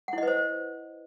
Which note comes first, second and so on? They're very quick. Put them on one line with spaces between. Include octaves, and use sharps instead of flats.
F#5 E4 D#5 B4 C5